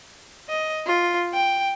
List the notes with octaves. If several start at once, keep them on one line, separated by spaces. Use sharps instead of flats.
D#5
F4
G5